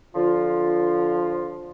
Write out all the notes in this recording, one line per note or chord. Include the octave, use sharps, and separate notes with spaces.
D3 F3 F4